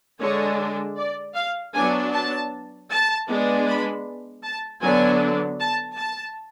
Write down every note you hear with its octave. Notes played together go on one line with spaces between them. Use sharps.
D3 G#3 D4 C#5
D5
F5
F#3 B3 D4 G#5
A5
A5
G#3 B3 D4
B5
A5
D3 F#3 B3 D4 G#5
A5
A5